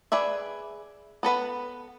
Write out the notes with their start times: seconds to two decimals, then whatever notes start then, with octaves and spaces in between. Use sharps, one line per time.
0.12 G#4 B4 D5 E5
1.23 B3 A4 B4 F#5